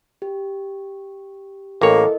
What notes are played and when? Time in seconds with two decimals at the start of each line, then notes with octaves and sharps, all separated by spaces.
0.22 G4
1.81 A1 A#3 E4 A4 A#4 C#5 D#5